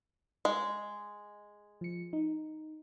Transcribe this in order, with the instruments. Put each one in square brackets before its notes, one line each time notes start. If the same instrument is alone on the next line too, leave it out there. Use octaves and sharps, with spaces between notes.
[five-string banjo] G#3
[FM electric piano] F3 C#7
D#4